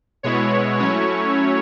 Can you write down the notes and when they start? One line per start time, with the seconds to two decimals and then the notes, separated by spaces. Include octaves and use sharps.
0.23 B2 G#3 B3 E4 C#5
0.79 F#3 A3 C#4 E4 C#5